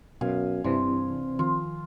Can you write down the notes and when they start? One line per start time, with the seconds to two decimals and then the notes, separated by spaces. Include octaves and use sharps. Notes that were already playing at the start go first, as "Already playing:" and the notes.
0.21 F#2 B2 F5 G#5
0.64 G2 C3 E3 C4 D4 C6
1.39 D#3 F3 F4